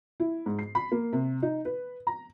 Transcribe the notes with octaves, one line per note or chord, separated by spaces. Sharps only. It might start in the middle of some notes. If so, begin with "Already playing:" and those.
E4
G#2
C7
B5
A#3
C3
D#4
B4
A#5